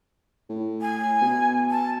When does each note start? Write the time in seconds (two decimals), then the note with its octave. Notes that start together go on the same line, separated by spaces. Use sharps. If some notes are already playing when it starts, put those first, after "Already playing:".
0.50 A2
0.82 G#5
1.22 B2
1.71 A5